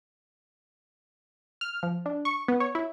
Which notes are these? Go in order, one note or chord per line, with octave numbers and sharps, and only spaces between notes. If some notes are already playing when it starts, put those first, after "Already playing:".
F6
F3
D4
C#6
B3
C#5
E4